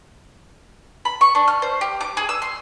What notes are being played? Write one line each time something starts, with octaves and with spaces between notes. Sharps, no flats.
B5
C#6
D4
F6
C5
G4
D6
G#4
E6
C6